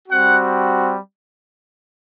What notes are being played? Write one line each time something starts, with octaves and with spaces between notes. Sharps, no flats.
G3 C4 F#4 F#5